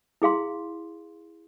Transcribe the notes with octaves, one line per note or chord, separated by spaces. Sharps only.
E4 G#4 F5 C6